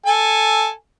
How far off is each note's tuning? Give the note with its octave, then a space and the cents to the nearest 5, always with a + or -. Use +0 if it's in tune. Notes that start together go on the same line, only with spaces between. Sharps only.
A4 +0 G#5 +0